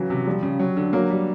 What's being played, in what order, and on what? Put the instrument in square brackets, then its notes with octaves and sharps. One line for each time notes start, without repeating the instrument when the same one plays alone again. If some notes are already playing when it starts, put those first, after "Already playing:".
Already playing: [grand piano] C#3 E3 [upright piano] F#3
[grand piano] C3
[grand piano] F3 [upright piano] G3
[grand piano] C#3
F#3
D3
[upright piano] F#3 [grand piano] A#3
[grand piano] G3